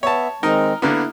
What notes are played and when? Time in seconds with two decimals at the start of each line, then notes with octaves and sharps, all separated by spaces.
0.03 B3 C#5 E5 A5
0.43 D#3 G#3 C4 D#4 A#4
0.82 D3 A#3 B3 E4